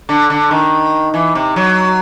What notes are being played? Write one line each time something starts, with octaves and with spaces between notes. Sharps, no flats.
D3
D3
D#3
E3
C3
F#3